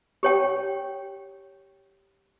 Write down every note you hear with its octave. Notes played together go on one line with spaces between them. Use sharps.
G4 C#5 G5